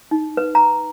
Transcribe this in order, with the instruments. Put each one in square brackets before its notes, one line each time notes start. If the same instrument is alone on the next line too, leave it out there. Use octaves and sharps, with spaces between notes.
[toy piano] D#4
B4
A#5